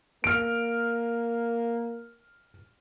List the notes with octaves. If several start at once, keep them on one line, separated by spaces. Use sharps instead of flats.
A#3 F6 D7